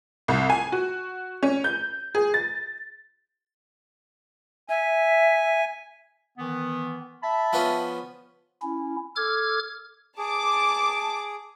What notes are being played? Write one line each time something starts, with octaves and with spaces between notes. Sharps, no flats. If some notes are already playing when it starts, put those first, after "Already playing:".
C2
G#5
F#4
C#4
G6
G#4
A6
E5 G#5
D#3 E3 B3
E5 A5 B5
F3 B3 C#4
C#4 E4
A4 D6 F6 G#6
G#4 A5 D6